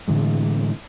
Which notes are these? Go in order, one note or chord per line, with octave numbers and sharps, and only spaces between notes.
A2 D3 E3 G#3